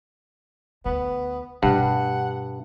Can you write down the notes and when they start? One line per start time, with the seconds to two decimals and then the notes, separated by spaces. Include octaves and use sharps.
0.85 D2 D3 B3
1.63 G2 B2 A3 F#5